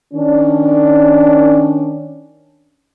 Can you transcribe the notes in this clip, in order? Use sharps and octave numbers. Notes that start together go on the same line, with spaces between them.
D#3 C#4 D4